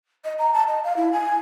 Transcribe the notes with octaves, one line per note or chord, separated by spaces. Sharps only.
D#5
A#5
A5
D#5
F5
E4
G#5